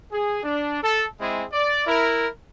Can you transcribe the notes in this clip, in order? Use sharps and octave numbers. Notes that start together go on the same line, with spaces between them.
G#4
D4
A4
G#3 C4 E4 G#4
D5
E4 A#4